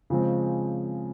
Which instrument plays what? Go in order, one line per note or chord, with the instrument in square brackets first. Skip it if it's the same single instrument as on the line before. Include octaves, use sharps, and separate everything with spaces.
[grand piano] C#3 F3 G#3 C4